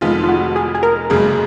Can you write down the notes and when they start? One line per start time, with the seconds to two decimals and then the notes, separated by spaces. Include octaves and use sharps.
0.01 F1 F2 D#3 G#3 B3 F4
0.24 F4
0.29 F#4
0.56 G#4
0.75 G#4
0.83 A#4
1.10 F#1 F#2 C#3 G#3 G#4